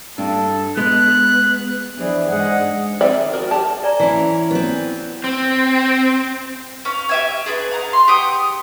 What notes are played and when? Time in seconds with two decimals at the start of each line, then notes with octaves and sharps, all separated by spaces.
0.18 G2 D4 A4
0.77 G#3 B3 F#6
1.98 E3 D4 G#4 C5 D5
2.30 G#2 G#4 D#5 F#5
3.01 C4 D#4 D5 E5 G#5
3.20 D#3
3.32 F#4 A#4 D5
3.51 G4 D5 A5
3.84 D5 G#5 A#5
4.00 E3 C#4
4.51 B3 C4
5.24 C4
6.85 C#4 F5
7.09 G4 E5 G#5
7.46 B3 D4 G#4
7.71 F5 F#5 A#5
7.93 C6
8.08 G4 F#5 G5 D#6